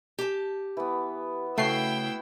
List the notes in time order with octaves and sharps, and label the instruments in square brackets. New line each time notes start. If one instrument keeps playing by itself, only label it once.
[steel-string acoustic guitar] G4 A5
[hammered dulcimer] E3 B3
[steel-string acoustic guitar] C#3 [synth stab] A3 C7 [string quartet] E4 G5 E6 [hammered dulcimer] F#4